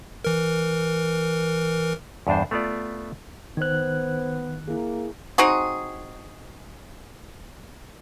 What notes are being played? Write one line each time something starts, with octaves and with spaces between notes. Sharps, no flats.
E3 A#4
E2 G2 D4 C5
A3 B3 F4 D5
D#3 B3 C5 F#6 G#6
A#3 E4 G#4
C4 D#4 F#4 G#4